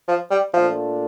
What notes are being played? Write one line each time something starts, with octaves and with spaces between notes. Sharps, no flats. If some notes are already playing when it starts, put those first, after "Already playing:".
F3
G3
A#2 F3 A3 D4 F4